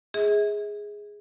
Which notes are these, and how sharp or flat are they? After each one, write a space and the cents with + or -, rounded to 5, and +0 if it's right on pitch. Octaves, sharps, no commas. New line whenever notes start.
G#4 -5 E5 -40